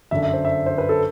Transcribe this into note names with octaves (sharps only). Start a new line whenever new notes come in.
G1 F#2 D3 E5
E5
C5
E5
C5
B4
A4